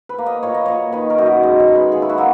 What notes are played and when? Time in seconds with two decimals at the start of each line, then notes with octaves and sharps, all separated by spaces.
0.09 B4
0.18 A#3
0.26 D#5
0.43 A#2 C#5
0.54 D#5
0.66 A#2 C#5
0.92 D#3 B4
1.10 A#4
1.18 F#2
1.26 D#5
1.43 G#3 D#5
1.60 C#5
1.68 G#3
1.75 B4
1.92 A#2 G#4
2.02 E4
2.09 F#4
2.18 A#3 E4